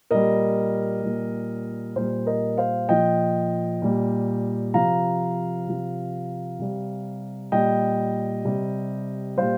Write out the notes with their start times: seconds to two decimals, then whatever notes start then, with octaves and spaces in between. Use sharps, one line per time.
0.11 A#2 G3 A#4 D#5
1.03 A#2 G3
1.96 A#2 G3 C5
2.27 A#4 D#5
2.58 C5 F5
2.89 A#2 F3 D#5 G5
3.82 A#2 G3
4.74 C3 F3 F5 A#5
5.67 C3 F3
6.59 C3 G3
7.52 A#2 G3 D#5 G5
8.45 C3 G3
9.37 A#2 G3 C5 F5